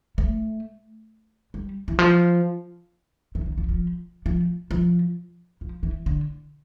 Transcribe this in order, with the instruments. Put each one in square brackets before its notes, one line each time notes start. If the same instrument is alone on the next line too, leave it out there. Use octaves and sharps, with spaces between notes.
[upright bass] A3
G3
E3
F3
E3
D3
F3
F3
F3
F3
F3
E3
D3